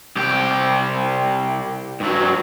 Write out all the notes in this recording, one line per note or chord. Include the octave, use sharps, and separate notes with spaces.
C2 G4
G2 F#3